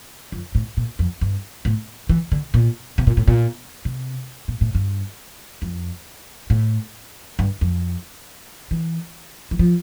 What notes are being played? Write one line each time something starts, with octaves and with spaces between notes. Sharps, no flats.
F2
A2
A#2
F2
G2
A2
E3
D3
A#2
C3
A#2
A2
A#2
C3
A#2
A2
G2
F2
A2
G2
F2
E3
E3
F3